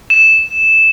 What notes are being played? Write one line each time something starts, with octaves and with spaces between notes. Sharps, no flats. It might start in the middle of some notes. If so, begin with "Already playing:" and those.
E7